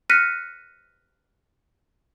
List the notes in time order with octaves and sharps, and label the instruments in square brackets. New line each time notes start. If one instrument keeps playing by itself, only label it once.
[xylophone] F6 F#6 A#6 B6 C#7 D#7